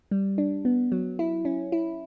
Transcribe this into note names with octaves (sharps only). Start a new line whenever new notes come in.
G3
D4
B3
F#3
E4
C#4
E4